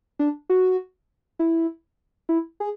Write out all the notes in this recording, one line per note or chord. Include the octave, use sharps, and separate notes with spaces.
D4
F#4
E4
E4
G#4